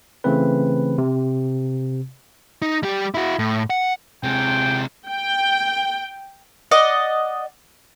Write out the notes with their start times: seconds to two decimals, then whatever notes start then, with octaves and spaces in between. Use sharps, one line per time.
0.24 C#3 E3 A3 C4 B4
0.98 C3
2.62 D#4
2.83 G3 G4
3.14 E4 F#4
3.39 A2
3.70 F#5
4.23 C3 G#3 G5
5.08 G5
6.71 D5 D#5 F#5